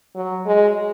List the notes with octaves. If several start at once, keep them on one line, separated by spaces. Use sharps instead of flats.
F#3
G#3